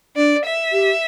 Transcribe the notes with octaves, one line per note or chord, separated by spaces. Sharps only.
D4 D5
E5
G4